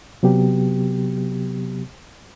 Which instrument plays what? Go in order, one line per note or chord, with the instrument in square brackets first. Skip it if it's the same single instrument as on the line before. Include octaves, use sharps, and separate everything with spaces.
[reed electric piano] C3 F#3 B3 G4